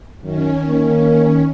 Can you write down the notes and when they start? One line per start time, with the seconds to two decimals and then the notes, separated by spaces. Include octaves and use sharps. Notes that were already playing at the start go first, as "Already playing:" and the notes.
0.22 F#2 D#3 C#4
0.68 A#3